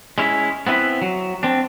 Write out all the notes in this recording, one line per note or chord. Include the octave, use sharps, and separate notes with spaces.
G#3 C#4 E4
B3 C4 E4 B4
F#3
C4 D4